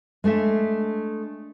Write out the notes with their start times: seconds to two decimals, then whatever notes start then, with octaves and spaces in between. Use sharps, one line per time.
0.24 G#3 A3 D4 E5